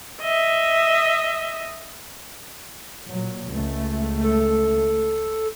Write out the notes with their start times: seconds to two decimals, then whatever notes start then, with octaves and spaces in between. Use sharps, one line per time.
0.21 D#5 E5
3.12 A#2 F#3
3.52 C#2 A3
4.23 A4